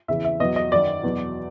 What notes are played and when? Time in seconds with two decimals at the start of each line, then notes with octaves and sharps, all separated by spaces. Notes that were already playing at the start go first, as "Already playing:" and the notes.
0.08 E2 C#3 E3 E5
0.24 E5
0.40 E2 B2 F#3 D#5
0.56 D#5
0.72 F#2 D#3 F#3 D5
1.03 E2 B2 F#3